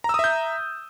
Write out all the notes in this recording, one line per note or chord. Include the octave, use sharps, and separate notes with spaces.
E5 A#5 D#6 E6 G6